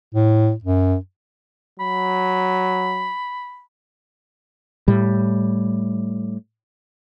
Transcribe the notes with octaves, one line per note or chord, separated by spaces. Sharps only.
A2
F#2
F#3 B5
A2 G3